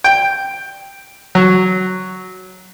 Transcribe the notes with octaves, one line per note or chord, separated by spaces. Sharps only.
G5
F#3